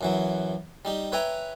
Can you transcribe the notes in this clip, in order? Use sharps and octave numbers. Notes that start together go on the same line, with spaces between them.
F#2 E3 F#3
G3 D#4 G4
B4 C#5 E5 G5 G#5 A#5